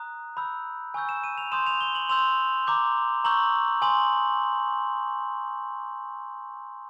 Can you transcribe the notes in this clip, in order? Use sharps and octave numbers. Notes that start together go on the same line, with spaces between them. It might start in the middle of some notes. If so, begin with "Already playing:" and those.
Already playing: A#5 D#6 F#6
B5 E6 G6
G#5 C#6 E6 G6
E7
D#7
F7
C6 D#6 G6 E7
F7
G7
F#7
C6 E6 G6 F7
A#5 D6 G6
A#5 C#6 E6 G6 F#7
G#5 C6 D#6 F#7